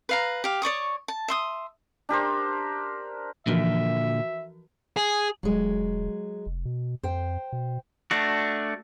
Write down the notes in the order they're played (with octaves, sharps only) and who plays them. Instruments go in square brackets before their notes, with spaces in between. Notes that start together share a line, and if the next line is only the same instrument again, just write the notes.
[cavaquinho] B4 F5 A#5
G4 F5
C#5 D5 C#6 D#6
A5
E5 C6 D#6
[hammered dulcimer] D4 G4 A#4 C5
[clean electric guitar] A#2 D3 [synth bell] E3 F3 F#4 [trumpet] E5
[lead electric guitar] G#4
[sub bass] E1 [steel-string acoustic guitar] F#3 G#3
[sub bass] F1
B2
[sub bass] F2 [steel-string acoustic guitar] C5 G5
[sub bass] B2
[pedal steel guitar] A3 D4 F#4